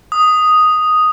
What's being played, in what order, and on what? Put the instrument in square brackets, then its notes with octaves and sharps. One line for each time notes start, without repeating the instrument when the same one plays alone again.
[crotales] D#6